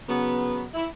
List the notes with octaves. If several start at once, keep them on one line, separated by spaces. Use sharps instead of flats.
C#3 F#3 B3
E4